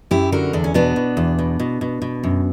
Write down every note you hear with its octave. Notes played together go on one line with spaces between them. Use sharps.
F#2 E4 G4
D3 F#4 A#4
E2 D4
C#4
B2 B3 D4
B2
E2
B2
B2
B2
B2
F#2